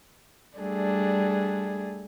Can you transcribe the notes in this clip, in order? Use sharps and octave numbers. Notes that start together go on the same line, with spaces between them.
G3 A3 D4 G#4